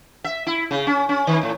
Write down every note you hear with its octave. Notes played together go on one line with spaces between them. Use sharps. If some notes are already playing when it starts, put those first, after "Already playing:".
E5
E4
C#3
C#4
C#4
D#3
A2